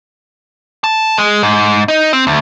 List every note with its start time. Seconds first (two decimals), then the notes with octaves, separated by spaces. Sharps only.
0.84 A5
1.18 G#3
1.43 G#2
1.88 D#4
2.13 C4
2.27 D2